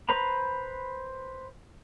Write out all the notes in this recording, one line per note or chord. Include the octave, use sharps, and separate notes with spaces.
B4 C5 A#5 B5